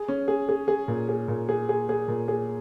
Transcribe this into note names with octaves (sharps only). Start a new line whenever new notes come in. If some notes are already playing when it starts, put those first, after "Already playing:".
Already playing: G#4
C#4
G#4
G#4
G#4
A#2
G#4
A#2
G#4
G#4
G#4
A#2
G#4